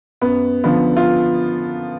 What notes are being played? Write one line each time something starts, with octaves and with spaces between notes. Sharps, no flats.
F#2 B3
D3 F3 B3
F4